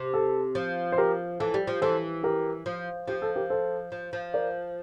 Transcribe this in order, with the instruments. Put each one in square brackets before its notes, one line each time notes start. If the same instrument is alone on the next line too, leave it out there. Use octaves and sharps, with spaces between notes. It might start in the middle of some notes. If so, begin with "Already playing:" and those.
Already playing: [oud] C3
[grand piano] A4
[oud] F3
[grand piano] C5
G4 A#4
[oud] E3 [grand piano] A4
[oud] G3
F3
[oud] E3 [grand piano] A4 C5
[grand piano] G4 A#4
[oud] F3
[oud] F3 [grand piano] G4
[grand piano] A4
G4 A#4
A4 C5
[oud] F3
F3
[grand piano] A#4 D5